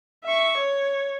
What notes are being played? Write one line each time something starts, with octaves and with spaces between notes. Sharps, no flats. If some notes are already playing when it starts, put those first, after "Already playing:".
E5 C#6
C#5